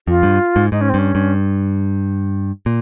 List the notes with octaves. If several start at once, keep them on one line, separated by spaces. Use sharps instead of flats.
F2 F4
G2
G#2
G#2 D#4
C#4
C4
G2 C#4
G2
A#2